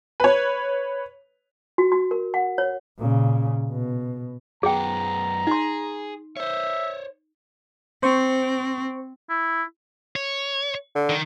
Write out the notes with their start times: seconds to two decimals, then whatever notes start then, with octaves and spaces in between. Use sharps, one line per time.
0.20 B4 C#5
1.78 F#4
1.92 F#4
2.11 A#4
2.34 F#5
2.58 C#5
2.98 A#2 C#3
3.71 B2
4.63 F#2 B3 G#4 G5 A#5
5.47 D#4 G#4 C6
6.37 C5 C#5 E5
8.03 C4 C5 C#6
9.30 E4
10.16 C#5
10.95 D3
11.09 D#3